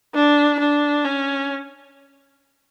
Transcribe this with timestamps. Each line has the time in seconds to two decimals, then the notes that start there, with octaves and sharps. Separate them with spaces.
0.14 D4
0.60 D4
1.05 C#4